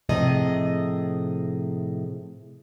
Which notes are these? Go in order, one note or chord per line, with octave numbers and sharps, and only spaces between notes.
A2 C3 F3 G#4 D#5